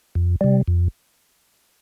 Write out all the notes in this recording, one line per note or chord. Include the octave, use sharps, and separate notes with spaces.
F2
C3 G3
F2